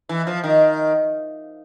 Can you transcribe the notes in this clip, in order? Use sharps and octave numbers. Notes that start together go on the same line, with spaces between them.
E3
F3
D#3